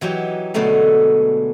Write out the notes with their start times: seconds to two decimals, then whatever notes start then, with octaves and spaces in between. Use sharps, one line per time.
0.01 E3 F#3 D#4 G4
0.54 B2 D3 F#3 G#3 A3 D#4